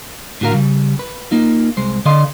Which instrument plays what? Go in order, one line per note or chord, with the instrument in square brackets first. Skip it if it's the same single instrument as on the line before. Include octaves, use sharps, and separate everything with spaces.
[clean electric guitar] A2 D3 F#4 G#4 A#4 F5
C#3 G3
B4
A#3 D#4 F4
C2 G#3 C5
D3 A4 D5 D#5 F5 C6